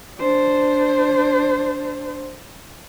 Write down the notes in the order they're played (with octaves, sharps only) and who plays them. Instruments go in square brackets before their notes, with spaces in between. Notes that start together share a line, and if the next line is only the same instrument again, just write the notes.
[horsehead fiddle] D4 C5